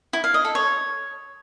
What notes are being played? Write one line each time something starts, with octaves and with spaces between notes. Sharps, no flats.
E4
F5
D#5
A4
C#5